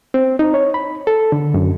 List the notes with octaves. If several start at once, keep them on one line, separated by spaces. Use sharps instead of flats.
C4
D#4
C#5
B5
A4
D3
F#2